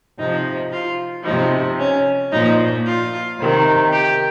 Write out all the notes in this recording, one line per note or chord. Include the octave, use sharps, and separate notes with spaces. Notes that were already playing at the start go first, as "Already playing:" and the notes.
C3 F3 D#4
F4
C3 F3 D#4
C#4
A#2 F3 D#4
F4
C3 D#3
G4